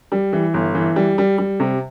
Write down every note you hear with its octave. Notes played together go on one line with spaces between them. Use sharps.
G3
E3
G1
E3
G3
G3
G3
C3